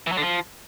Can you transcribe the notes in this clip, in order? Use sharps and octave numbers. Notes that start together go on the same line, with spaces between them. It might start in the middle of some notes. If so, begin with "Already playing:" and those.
E3
F#3
D3
F3